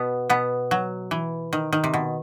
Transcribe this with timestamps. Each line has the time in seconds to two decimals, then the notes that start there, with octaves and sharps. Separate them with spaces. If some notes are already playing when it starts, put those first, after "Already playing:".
Already playing: B2 B3
0.30 B2 B3
0.71 F#3
1.11 E3
1.53 D#3
1.73 D#3
1.84 C3
1.94 B2